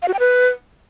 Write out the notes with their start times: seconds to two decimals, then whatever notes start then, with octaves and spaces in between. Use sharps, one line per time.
0.02 F5
0.08 F#4
0.14 G5
0.19 B4